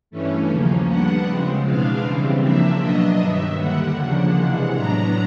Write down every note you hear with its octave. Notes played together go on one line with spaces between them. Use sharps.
G2 E3 A3 C#4
D#2 C#3 F3 A#3 C#4
D3 G3 B3 D4 F#5
C#3 F3 G#3 C4
E2 B2 G#3 B3 D4 F5
C#3 E3 G3 C4
C#3 F3 A#3 D4 E5
B2 F#3 B3 D4 D#5
G2 D#3 F#3 E5
D#2 D3 G3 F#5
C#3 F3 A#3 D4 F#5
C3 E3 G#3 F#5
A2 F#3 B3 D4 A#5